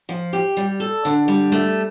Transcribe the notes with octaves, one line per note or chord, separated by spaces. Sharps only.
F3
G4
G3
A4
D3
G3
A3